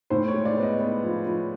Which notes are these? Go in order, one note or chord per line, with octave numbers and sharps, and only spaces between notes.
A2 C5
C#5
G#3
D5
B3
D#5
B3
F3
F3